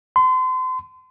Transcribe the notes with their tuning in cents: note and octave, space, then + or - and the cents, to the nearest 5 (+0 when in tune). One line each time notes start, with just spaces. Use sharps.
C6 -35